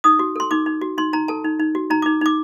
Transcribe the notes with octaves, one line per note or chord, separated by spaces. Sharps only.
D#4 D#6
F#4
A4 C6
D#4 D6
D#4
F#4
D#4 C6
D#4 A#5
A4 A5
D#4
D#4
F#4
D#4 A#5
D6
D#4
D#4 D6